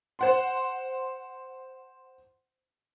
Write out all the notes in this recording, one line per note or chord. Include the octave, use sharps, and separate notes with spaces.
C5 F#5 C6